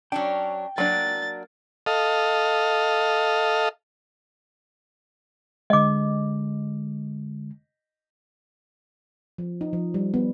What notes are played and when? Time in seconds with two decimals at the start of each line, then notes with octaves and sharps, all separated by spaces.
0.12 F#3 C#4 D4 G5
0.78 F#3 A#3 D4 A6
1.86 A4 D#5 F5
5.70 D3 G#3 D#5 D6
9.38 F3
9.61 D#4
9.73 F3
9.94 G3
10.14 B3